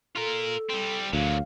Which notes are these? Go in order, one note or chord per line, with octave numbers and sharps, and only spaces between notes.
F4 A4 A#4
G3 C4
D2 A#2 F#3 F5